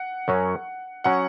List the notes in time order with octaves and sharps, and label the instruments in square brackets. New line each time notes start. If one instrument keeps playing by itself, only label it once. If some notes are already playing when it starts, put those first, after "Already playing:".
Already playing: [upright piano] F#5
[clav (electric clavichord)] F#2 F#3 C#4
[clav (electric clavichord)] F#3 C#4 [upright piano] F#5